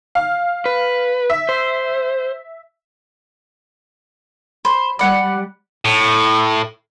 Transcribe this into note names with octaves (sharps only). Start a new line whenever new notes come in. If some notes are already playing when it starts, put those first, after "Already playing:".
F5
B4
E5
C5
C5 B5
G3 D5 F#5 B5 C#7
A2